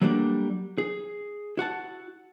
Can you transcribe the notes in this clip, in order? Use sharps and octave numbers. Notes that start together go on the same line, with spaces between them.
F#3 G3 A3 A#3 C4 D4
G#4
E4 F#4 F#5 A5